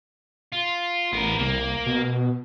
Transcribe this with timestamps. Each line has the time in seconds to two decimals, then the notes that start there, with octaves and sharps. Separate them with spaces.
0.52 F4
1.13 A1 B3 A#4
1.39 C2 A#3
1.86 B2